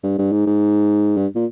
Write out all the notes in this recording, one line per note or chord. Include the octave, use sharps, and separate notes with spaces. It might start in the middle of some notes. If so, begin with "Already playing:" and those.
G2
G2
G#2
G#2
G2
A#2